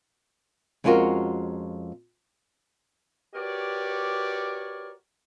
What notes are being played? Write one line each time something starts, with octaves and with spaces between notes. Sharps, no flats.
F2 G#3 C#4 F4 F#4 A#4
F#4 G4 A#4 B4 C#5 D5